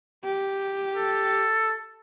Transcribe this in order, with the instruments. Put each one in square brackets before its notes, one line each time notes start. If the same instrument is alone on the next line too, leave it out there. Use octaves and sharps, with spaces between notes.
[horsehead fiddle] G4
[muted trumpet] A4